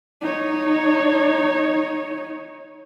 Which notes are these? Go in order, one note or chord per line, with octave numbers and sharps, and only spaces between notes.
D#4 C#5